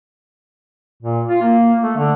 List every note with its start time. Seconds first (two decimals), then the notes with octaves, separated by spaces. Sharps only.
1.03 A#2
1.29 F4
1.42 A#3
1.83 A3
1.97 D3